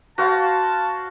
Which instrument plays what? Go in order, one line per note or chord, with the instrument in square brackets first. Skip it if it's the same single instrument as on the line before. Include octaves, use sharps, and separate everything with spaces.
[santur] F#4 C5 F5 [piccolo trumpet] A5